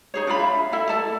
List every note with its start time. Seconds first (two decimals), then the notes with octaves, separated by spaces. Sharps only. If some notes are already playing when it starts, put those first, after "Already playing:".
0.14 D#4 G#4 C#5
0.27 D4 F4 F5 B5
0.40 E5
0.72 E4 A4 E5
0.89 A4 D5 A5